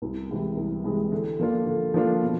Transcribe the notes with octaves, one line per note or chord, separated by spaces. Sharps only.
C2
C3 E3 G#3
C2
C3 E3 G#3
D3
F3 A#3 D4 F4
D3
F3 A#3 D4 F4
B2